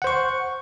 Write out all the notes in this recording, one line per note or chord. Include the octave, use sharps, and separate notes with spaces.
C5 F#5 C#6